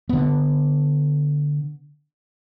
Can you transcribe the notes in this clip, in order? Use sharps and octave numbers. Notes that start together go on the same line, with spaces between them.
D3 B3